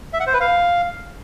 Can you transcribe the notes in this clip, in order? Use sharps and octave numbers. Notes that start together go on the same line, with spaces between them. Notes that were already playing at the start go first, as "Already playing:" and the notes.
E5
F#5
C5
B4
F5